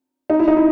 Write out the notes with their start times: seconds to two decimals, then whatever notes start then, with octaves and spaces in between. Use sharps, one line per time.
0.30 D#4
0.39 E4
0.48 D#4
0.57 E4